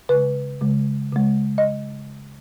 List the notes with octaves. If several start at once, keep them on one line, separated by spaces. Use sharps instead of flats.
C#3 G#3 B4
C#3 G#3
C#3 G#3
D#5